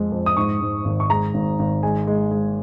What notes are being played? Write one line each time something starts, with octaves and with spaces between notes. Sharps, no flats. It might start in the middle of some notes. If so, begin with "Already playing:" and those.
Already playing: F2 G#3
F2
D#6
G#2 C#6
G#2
G#1
C#6
G#3 A#5
G#1
G#1
G#3 G#5
G#3
G#3